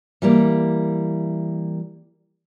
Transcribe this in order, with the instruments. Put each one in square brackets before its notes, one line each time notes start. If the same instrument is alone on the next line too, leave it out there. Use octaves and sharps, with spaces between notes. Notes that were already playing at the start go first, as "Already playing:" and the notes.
[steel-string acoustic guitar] E3 G3 A#3